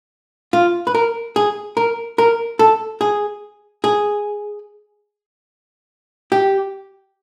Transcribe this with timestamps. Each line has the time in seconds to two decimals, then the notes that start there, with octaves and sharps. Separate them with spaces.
0.53 F4
0.87 B4
0.95 A#4
1.36 G#4
1.77 A#4
2.18 A#4
2.59 A4
3.01 G#4
3.84 G#4
6.32 G4